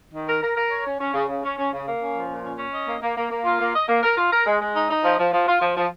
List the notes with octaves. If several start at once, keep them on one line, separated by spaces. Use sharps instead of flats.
D#3
A#4
A#4
A#4
C#5
C#4
C#4
C#3
C#3
C#4
C#4
C#3
A#3
C#4
F3
A#2
C#4
C#4
D#5
A#3
A#3
A#3
A#3
F4
A#3
D#5
A#3
A#4
F4
A#4
G#3
G#3
D#4
D#4
F3
F3
F3
F4
F3
F3